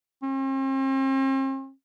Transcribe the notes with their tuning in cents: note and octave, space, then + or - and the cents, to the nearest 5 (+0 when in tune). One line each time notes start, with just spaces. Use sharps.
C4 +45